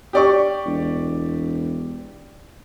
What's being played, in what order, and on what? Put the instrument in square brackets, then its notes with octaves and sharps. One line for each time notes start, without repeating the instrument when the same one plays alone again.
[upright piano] G4 D5 C#6
[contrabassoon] E1